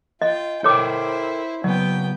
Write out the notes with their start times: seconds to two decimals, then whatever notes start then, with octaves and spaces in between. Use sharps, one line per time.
0.22 F4 D#5 G5
0.64 E4 A4 A#4 C5 C#5 G5 D6
1.64 C#3 F#3 B3 D5 G5